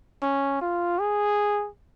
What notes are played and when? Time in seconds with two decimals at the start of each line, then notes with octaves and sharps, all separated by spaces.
0.22 C#4
0.61 F4
0.99 G#4